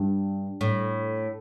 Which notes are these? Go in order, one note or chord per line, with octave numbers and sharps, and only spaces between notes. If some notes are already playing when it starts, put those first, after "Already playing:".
Already playing: G2
A2